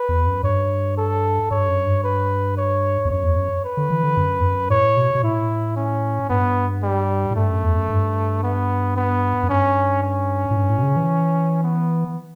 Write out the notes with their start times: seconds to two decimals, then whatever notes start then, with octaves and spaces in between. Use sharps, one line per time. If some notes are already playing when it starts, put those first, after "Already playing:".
Already playing: B4
0.09 E2
0.26 F#2
0.44 G2 C#5
0.97 A4
1.51 G2 C#5
1.68 F#2
1.86 G2
2.04 B4
2.58 C#5
3.05 E2
3.11 F#2 C#5
3.24 E2
3.37 F#2
3.64 B4
3.77 D3
3.90 E3
4.04 D3
4.17 F#2
4.40 E2
4.43 F#2
4.70 A2 C#5
4.97 B2
5.15 B2
5.23 A2 E4
5.76 C#4
6.29 G2 B3
6.83 G3
7.31 A2
7.36 G2 A3
7.50 F#2
7.64 E2
7.77 F#2
7.90 G2
8.43 B3
8.96 B3
9.43 F#2
9.49 G2 C#4
10.02 C#4
10.51 A2
10.56 G2
10.70 A2
10.78 B2
10.83 C#3
10.96 E3
11.63 B3